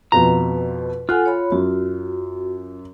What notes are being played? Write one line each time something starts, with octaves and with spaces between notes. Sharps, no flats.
F2 B2 F3 B4 A#5
F4 A4 F#5 G#5 F#6
C#5 B5
F#2 F#4